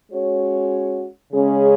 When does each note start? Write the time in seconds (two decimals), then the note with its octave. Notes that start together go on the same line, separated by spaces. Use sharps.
0.10 G#3 C#4 F#4 C#5
1.30 C#3 G#3 C#4 G#4